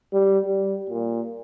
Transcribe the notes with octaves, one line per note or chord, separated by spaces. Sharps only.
G3
G3
A#2